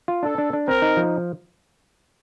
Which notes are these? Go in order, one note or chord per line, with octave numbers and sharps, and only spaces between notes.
F4
D4 A4
D4
D4
C4 A#4
D#4
F3